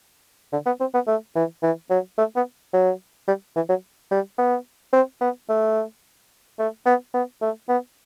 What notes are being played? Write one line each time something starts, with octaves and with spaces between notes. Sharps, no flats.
D3
B3
C4
B3
A3
E3
E3
F#3
A3
B3
F#3
G3
E3
F#3
G3
B3
C4
B3
A3
A3
B3
B3
A3
B3